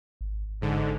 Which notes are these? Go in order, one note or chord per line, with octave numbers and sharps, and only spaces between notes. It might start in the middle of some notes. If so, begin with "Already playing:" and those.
G#1
G#2 D3